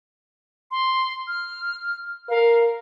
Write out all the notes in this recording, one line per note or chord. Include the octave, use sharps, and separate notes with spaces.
C6
F6
A#4 F5